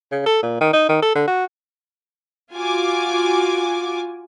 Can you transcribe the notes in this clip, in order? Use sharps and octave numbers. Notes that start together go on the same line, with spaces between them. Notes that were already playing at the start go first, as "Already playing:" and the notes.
C#3
A4
A#2
D#3
D#4
D#3
A4
D3
F#4
F4 F#4 G#5 D6